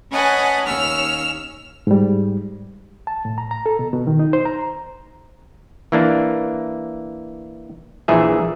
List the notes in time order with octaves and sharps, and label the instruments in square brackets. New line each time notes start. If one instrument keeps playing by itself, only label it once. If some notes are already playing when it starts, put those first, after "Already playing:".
[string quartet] C#4 B4 D#5 F#5 G#5 A5
D#2 C#4 E6 F6
[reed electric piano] G#2 G3
A5
A2
A#5
A#5
A4
B2
B2
D#3
D#4
C5
A#5
[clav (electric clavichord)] E3 A#3 D4
A#1 A#2 E3 G#4 E5